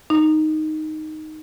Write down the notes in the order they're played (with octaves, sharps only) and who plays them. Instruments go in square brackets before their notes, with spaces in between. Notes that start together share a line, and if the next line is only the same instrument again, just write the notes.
[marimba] D#4